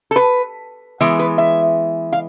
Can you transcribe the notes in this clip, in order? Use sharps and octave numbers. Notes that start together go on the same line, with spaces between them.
A4
B4
E3 G#3 B3
B4
E5
F5